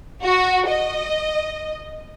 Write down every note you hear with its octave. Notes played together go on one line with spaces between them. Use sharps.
F#4
D#5